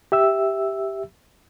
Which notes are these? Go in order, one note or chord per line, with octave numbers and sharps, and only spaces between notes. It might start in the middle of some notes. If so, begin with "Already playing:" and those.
G4 E5 E6